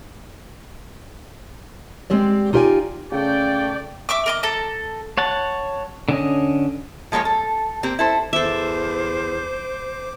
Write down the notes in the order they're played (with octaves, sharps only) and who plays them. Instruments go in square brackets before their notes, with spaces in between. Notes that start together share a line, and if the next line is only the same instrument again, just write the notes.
[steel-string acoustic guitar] G#3 C4 G4 D5
D#4 F4 G4 B4 D5 G#5
[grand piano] C#3 [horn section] A3 G5 [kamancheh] D5
[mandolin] E5 C#6 D6
A#4 D#5 D6
A4 A5 A#5
[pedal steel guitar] C#5 F#5 A5
D3 C#4 D#5
[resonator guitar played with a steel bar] F3 G#3 A#3 A#4 C#5
A4
A#3 C4 G4
E4 A4 C5
[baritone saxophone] E2 [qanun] A4 E5 [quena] C5 [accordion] D6